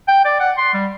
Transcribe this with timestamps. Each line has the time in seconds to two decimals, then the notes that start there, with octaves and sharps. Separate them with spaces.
0.08 G5
0.25 D5
0.40 F#5
0.58 C6
0.74 G3